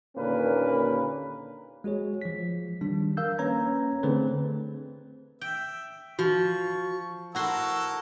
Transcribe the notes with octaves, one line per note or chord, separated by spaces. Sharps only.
D#2 A#2 D3 C#4 A#4 B4
G#3 F#4 G#4 C#5
F3 B6
D#3 G3 D4
A#4 F5 E6 G6
A#3 C#4 B4 C#5 A#5 G#6
D3 A3 C4 G#4 B4 C5
E5 G5
F3 F#4 C#6
E4 F#4 A4 A#4 F#5 C6 E6